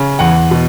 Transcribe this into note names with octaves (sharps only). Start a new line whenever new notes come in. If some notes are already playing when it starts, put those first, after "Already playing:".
Already playing: C#3
E2 F#5
B2